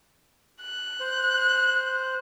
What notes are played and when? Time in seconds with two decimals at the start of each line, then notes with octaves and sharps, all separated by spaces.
0.61 F#6
1.00 C5